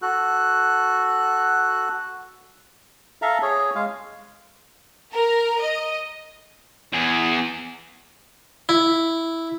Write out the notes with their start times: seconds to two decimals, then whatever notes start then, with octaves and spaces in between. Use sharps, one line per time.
0.02 F#4 A4 F#6
3.22 A4 E5 F5 A#5
3.42 G#4 C#5
3.75 G#3 F5
5.13 A#4
5.61 D#5
6.93 E2 G#4
8.69 E4